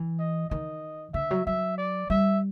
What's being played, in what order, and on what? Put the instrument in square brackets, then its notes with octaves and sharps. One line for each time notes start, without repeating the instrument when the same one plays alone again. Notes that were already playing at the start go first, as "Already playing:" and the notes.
Already playing: [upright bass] E3
[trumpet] D#5
[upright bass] D#3 [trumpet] D#5
[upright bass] D3 [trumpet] E5
[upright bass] F#3
[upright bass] F#3 [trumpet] E5
[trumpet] D5
[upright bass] G3 [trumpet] E5